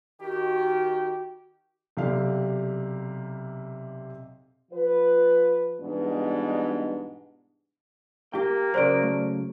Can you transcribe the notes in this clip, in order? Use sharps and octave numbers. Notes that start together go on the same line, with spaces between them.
D#3 F#4 G4
B1 C3 G4 D5 F5
F3 F4 B4
G#2 B2 E3 G3 B3 D4
A#3 G4 G5
C#3 F#3 A#4 C5 D5 D7
A3